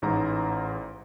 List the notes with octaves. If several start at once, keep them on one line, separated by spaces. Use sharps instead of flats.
A1 G#2 A#5